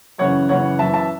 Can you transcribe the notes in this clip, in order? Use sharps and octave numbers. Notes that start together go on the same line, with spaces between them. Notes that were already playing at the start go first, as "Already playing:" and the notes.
F#2 C#3 E3 C#5 F#5
F#2 C#3 E3 C#5 F#5
F#2 E3 E5 A5
E5 A5